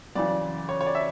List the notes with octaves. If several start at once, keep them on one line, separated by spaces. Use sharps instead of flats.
F#2 C#3 E3 D5
C#5
C#5
D5
E5